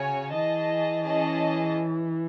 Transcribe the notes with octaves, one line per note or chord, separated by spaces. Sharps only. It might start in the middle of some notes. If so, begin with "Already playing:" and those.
Already playing: C#3 F#4 C#5 G#5
E3 G#4 D#5 A5
C#4 G#4 D#5 A5